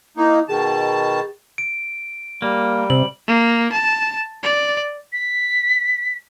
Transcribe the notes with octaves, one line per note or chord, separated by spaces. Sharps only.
A#3 D#4 E4
B2 D#3 G#4 A5
D7
G3 A#3
C3 F#7
A#3
A5
D5
B6